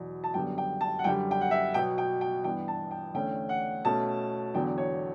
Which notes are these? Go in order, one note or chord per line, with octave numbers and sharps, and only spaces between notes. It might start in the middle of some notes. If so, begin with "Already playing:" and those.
Already playing: E2 B2 F#3
A5
F#2 D3 G3 B3 G5
G5
A5
F#5
F#2 D3 G3 G5
G5
F#5
E5
B2 F#3 B3 G5
G5
G5
G2 E3 B3 G5
A5
G5
E2 D3 A3 C#4 G5
F#5
B2 A3 C#4 A5
E2 D3 F#3 B3 G5
C#5